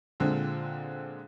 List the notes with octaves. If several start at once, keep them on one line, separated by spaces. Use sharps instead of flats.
A#2 D3 G#3 C4